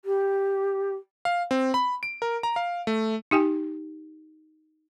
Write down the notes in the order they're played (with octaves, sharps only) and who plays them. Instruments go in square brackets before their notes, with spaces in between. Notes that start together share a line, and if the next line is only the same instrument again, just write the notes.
[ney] G4
[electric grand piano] F5
C4
B5
D7
A#4
A#5
F5
A3
[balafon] D#4 G4 G5 G#5